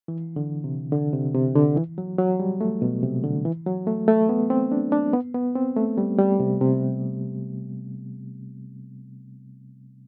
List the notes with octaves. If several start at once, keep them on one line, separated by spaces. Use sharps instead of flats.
E3
D3
C3
D3
C3
C3
D3
E3
F#3
F#3
G3
A3
B2
C3
D3
E3
F#3
A3
A3
B3
C4
D4
D4
B3
B3
C4
A3
G3
G3
C3
C3